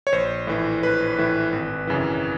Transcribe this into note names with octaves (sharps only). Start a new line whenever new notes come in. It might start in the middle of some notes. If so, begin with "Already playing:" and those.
C#5
A#1 C5
A2 E3
A#1 B4
A2 E3
G#1
F#2 C#3 E3